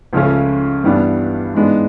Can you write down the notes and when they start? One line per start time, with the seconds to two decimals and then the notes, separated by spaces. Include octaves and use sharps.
0.13 C#2 C#3 F3 A3 C#4
0.84 G2 E3 G3 B3 D4
1.54 G#2 E3 G#3 B3 D4